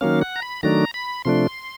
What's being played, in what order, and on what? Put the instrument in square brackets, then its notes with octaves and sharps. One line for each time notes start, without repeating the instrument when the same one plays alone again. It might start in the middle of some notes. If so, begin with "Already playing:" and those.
[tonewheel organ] D#3 F#3 A#3 C#4 F5
F#5
A#5
B5
D#3 F#3 A3 D4 A#5
B5
C3 F3 A3 D4 C6